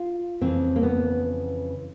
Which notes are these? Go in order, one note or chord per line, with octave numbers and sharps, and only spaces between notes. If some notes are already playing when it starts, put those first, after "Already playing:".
Already playing: F4
F2 C#3 E3 C4
A#3
B3